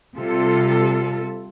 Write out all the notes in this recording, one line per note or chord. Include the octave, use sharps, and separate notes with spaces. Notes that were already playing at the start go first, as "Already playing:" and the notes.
C3 G3 F4 A4